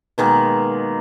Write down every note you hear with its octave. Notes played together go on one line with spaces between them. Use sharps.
B2 D#3 G#3 A#3